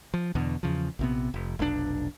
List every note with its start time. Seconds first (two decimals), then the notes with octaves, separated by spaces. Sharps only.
0.14 F3
0.35 E2 B2 D3
0.63 E2 C#3 F3
0.99 A#1 C3 B3
1.34 F1
1.59 F1 B1 G#2 D4